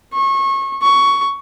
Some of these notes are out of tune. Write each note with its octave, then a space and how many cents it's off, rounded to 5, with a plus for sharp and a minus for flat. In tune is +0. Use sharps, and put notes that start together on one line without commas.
C#6 -25
C#6 +10